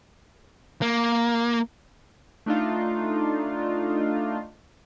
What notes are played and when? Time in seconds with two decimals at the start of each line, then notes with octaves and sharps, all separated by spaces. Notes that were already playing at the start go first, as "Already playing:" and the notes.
0.82 A#3
2.46 A3 D4 D#4 F4